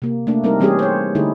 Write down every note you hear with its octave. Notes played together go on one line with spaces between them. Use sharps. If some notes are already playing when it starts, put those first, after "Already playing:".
C3 A#3
A3 A#3 D4
G3 C4 D#4 A#4
E3 G3 C4 C#4 G4 G#4
C5 C#5
D3 A3 D#4 E4 G#4 A4